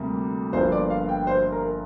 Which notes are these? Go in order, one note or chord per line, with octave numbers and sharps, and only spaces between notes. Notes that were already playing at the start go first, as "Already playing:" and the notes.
Already playing: D2 C3 G3 A#3
G1 G2 F3 A#3 C5
D5
F5
G5
C5
A#4